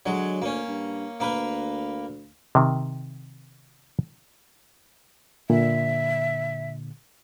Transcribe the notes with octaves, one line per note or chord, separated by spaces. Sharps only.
D3 F#3 G#3
D2 A#3 C#4
G2
D2 A#3 A#4 B4
C3 D#3
A#2 D3 E5